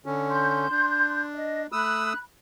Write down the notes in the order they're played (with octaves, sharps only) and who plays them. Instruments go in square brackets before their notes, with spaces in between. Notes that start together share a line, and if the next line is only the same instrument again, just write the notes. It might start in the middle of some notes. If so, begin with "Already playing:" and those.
[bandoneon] D3 C#4
[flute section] C6 G6
[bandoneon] D4
[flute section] D#5
[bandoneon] A3 D#6 E6 [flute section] B5 F#6